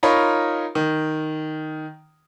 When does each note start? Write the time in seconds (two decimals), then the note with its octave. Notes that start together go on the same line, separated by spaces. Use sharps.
0.03 D#4 F4 A#4 C#5 A#5 B5
0.75 D#3